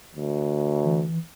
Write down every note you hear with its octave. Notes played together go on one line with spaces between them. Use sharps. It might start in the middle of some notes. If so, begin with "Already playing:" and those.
D2
E3